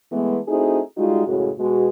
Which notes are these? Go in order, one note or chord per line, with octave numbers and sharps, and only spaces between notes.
E3 G#3 A3 B3
A3 C4 D#4 E4 F#4 G#4
G3 G#3 D#4 F4 F#4
F#2 A2 C#3 G#3 F#4
B2 G#3 F#4